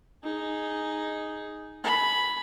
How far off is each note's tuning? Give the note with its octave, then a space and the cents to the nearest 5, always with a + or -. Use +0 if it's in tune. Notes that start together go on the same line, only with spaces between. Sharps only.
D#4 +0 G#4 +0
G#5 +35 B5 +0